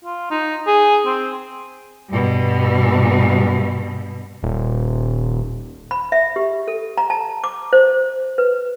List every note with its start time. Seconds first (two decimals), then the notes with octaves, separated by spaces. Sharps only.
0.05 F4
0.31 D#4
0.67 G#4
1.06 C4
2.09 G2 B2
4.43 D#1
5.91 B5
6.12 E5
6.36 G4
6.68 A4
6.98 A#5
7.10 A5
7.44 D6
7.73 C5
8.38 B4